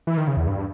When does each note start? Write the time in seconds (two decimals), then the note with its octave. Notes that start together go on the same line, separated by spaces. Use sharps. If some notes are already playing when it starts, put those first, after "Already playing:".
0.07 E3
0.17 D#3
0.27 C#3
0.37 E2
0.47 G2